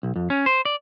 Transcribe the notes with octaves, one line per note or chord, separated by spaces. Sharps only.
B1
F2
C#4
C5
D5